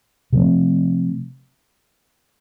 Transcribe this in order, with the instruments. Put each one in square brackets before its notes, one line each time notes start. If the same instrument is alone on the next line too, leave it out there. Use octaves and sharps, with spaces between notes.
[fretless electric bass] C3 F3 A3 C4